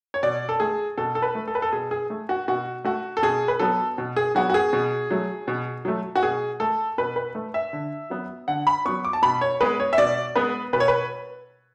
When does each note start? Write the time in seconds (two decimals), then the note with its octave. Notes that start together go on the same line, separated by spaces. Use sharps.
0.14 C#5
0.23 B2 D5
0.49 A4
0.60 A3 G#4
0.97 B2 A4
1.15 A4
1.22 B4
1.35 A3
1.48 A4
1.55 B4
1.62 A4
1.72 B2 G#4
1.91 G#4
2.10 A3
2.29 F#4
2.48 B2 F#4
2.84 A3 F#4
3.17 A4
3.22 B2 G#4
3.48 B4
3.60 F#3 B3 A4
3.98 B2
4.16 G#4
4.35 F#3 B3 F#4
4.50 F#4
4.54 G#4
4.73 B2
5.11 F#3 A3
5.48 B2
5.85 F#3 A3
6.16 F#4
6.23 B2 G#4
6.60 A3 A4
6.98 B2 B4
7.16 B4
7.35 A3
7.54 E5
7.73 D3
8.10 F#3 B3
8.48 D3 F#5
8.67 B5
8.85 F#3 B3 C#6
9.05 D6
9.13 A5
9.22 B2 B5
9.41 C#5
9.61 G#3 B3 B4
9.80 C#5
9.93 E5
9.98 B2 D5
10.35 G#3 B3 B4
10.73 B2 B4
10.80 C#5
10.88 B4